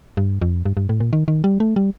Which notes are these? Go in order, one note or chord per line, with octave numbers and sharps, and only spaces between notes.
G2
F2
G2
G2
A2
A#2
D#3
D#3
G3
A3
G3